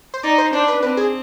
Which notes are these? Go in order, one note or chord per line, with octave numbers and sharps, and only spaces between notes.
C5
D#4 D5
C5
D4 C5
B4
C4 B4
G#4